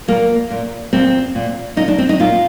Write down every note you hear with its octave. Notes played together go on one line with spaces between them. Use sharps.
A#2 A#3
A#2
A#2 C4
A#2
A#2 D#4
D4
C4
D#4
A#2 F4